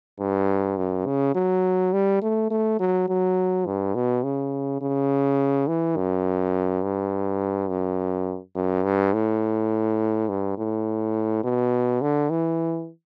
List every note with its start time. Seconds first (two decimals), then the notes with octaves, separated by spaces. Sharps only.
0.20 G2
0.77 F#2
1.06 C#3
1.35 F#3
1.93 G3
2.22 A3
2.51 A3
2.80 F#3
3.09 F#3
3.67 G2
3.95 B2
4.24 C#3
4.82 C#3
5.68 E3
5.97 F#2
6.83 G2
7.69 F#2
8.56 F#2
8.85 G2
9.14 A2
10.29 G2
10.58 A2
11.44 B2
12.02 D3
12.30 E3